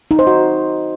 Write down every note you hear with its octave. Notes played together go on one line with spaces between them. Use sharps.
D#4
C5
F#4